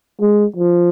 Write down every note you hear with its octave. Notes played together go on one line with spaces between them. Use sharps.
G#3
F3